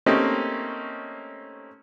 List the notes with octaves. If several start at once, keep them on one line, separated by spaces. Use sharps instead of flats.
A3 A#3 C4 C#4 D#4 G4